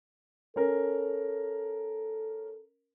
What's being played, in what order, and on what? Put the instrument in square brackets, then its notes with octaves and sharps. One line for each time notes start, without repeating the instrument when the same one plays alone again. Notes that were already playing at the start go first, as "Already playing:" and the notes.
[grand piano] C#4 A#4 [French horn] A4